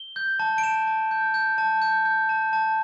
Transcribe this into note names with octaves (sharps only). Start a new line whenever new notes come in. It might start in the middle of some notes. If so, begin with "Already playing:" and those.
Already playing: G7
G6
A5
D7
A5 E7
A5
G6
G6
A5
G6
G6
A5
A5